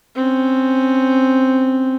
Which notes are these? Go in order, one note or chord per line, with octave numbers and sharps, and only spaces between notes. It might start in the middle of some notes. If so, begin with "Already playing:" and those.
C4 C#4